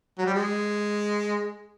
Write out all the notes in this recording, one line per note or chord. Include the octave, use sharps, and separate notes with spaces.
F#3
G3
G#3